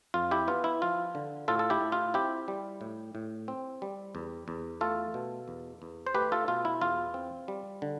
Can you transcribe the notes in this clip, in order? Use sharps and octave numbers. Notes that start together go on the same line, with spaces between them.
F2 F4
E4 G4
B3 F4
E4
F3 F4
D3
A2 F4 A4
A4
E4 G4
A2
F4
C4 E4 G4
G3
A2
A2
C4
G3
E2
E2
A3 F4 A4
B2
E2
E2
C5
A3 G4 B4
F4 A4
B2 F4
E4
E2 F4
C4
G3
D3